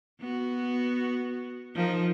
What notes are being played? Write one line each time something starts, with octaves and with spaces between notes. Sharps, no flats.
B3 F#4
F3 D#4 A#4